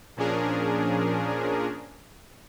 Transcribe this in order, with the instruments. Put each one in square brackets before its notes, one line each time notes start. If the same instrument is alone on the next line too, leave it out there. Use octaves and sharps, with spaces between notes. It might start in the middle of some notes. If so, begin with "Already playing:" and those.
[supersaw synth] A#2 F3 C#4 D4 G#4 A#4